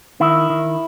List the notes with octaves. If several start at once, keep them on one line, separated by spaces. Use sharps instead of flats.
D#3 E4
D#3